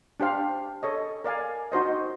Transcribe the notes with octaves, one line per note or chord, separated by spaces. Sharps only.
D4 G4 C5 F5
A4 C#5 D#5
A#4 D5 F5 G#5
D#4 F#4 C5 D#5